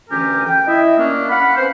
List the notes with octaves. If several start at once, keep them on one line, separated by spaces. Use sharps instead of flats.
D2 E3 C#4 G4 A#4 G#5
G5
E4 D#5 E5
A#3 C#4 D4
F5 F#5 B5
C4 C#4 B4 C5